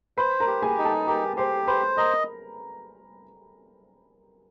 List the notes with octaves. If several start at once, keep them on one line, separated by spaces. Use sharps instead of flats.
B4 C5 B5
A#4 A#5
G4
G#4 G#5
D#4
A4 A5
G4 A#4 A#5
G4 C5 C6
B4 C5 B5
A#4 D#5 A#5